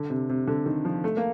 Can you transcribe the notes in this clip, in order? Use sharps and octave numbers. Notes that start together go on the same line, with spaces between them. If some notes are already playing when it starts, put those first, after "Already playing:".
Already playing: D3
C3
C3
D3
D#3
F3
A3
A#3